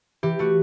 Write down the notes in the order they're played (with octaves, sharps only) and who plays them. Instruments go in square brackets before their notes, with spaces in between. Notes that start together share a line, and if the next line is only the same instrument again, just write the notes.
[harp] E3 G4
A3 F#4